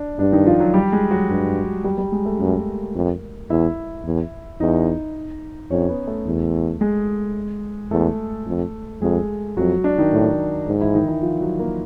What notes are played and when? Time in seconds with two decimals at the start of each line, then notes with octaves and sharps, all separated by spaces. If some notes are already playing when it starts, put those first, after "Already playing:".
Already playing: D4
0.19 G2 D4
0.33 D#3 D#4
0.46 F3 F4
0.60 F#3 F#4
0.74 G3 G4
0.92 G#3 G#4
1.11 F#3 F#4
1.29 G2
1.84 G3 G4
1.98 G3 G4
2.12 G#3 G#4
2.26 A3 A4
2.39 F#2 A#3 A#4
2.95 F2
3.50 E2 E4 E5
4.05 E2
4.60 E2 D#4 D#5
5.71 F2 C#4 C#5
5.89 B3 B4
6.07 A3 A4
6.26 E2
6.81 G#3 G#4
7.91 E2 A3 A4
8.46 F2
9.02 F2 G#3 G#4
9.57 F2 F#3 F#4
9.84 D4
9.98 D#3 D#4
10.12 A2
10.67 G#2
10.81 E3 E4
10.95 D#3 D#4
11.08 E3 E4
11.22 F3 F4
11.41 F#3 F#4
11.59 A#3 A#4